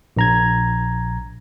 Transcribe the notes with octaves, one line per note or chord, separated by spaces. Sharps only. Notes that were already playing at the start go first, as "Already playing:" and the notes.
A#1 A#5 G#6